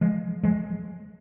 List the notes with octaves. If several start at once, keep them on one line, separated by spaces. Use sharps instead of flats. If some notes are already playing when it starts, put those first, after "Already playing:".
F3 G#3
F3 G#3